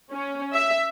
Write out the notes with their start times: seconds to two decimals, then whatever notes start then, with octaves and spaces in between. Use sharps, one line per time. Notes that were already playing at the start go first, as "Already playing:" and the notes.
0.11 C#4
0.54 E5